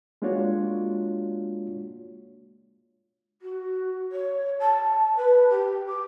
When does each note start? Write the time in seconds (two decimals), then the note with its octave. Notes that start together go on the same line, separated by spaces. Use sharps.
0.22 G#3 A#3 D4 F4 F#4 C#5
3.42 F#4
4.12 C#5
4.60 A5
5.17 B4
5.50 G4
5.88 D6